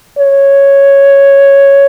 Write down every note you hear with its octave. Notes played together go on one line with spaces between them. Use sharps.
C#5